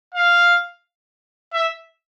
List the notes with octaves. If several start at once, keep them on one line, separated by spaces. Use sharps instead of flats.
F5
E5